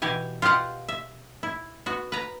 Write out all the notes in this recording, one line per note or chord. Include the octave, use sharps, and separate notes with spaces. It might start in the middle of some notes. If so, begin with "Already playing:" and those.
B2 E3 G4 G#5
F4 G4 D#5 F5 F#5
E5
E4
B3 F#4
B4 A#5